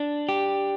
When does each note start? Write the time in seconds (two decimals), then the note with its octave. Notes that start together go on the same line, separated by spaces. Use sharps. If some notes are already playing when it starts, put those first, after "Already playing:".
Already playing: D4
0.29 G4